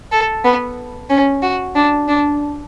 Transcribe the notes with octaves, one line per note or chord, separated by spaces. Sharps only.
A4
B3
C#4
F#4
D4
D4